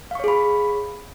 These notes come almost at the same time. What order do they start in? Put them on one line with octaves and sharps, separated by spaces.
F5 C#6 C#5 G#4 B5